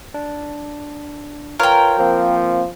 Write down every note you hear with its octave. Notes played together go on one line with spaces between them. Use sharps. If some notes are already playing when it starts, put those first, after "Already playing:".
D4
F4 A#4 B4 C#5 G5
F3 A#3 C4